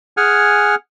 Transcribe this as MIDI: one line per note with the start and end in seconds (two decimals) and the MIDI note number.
0.17 0.75 68
0.17 0.75 78
0.17 0.75 80
0.17 0.75 89